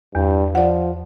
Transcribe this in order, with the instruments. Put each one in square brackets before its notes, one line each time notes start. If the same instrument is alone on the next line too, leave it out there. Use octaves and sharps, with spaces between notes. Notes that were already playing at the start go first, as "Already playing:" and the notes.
[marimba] E2 [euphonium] G2
[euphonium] F3 [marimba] D5 F#5